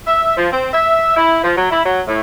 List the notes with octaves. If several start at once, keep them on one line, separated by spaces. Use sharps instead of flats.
E5
F3
C4
E5
E4
F3
F#3
E4
F#3
A2